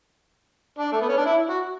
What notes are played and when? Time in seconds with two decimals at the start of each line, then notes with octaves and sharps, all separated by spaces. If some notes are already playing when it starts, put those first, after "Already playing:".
0.79 D4
0.92 A3
1.01 B3
1.09 C#4
1.17 D4
1.26 E4
1.49 F#4